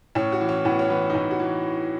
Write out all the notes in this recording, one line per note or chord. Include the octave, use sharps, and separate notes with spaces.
A2 C#4
F#4
E3
C#4
A2 B3
C#4
E3 B3
D#4
A2 C#4
F#4
E3